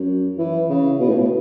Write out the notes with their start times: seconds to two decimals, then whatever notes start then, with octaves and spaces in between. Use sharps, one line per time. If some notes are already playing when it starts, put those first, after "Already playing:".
Already playing: F#2
0.39 E3
0.69 C#3
1.00 B2
1.09 A2
1.18 B2